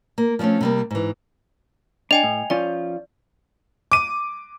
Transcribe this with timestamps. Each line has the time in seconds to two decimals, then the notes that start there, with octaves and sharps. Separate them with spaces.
0.18 A#3
0.39 F3 G3 A3 C4 C#4
0.61 C3 G3 A#3
0.91 G#2 E3
2.11 D4 D#5 G5 G#5 F7
2.23 A2
2.50 F3 C#4 F4 D5
3.92 D6 D#7